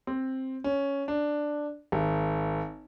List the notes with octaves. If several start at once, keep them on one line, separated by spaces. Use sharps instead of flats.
C4
C#4
D4
G#1